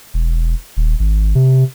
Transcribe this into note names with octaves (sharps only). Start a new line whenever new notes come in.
E1
D#1
G#1
C3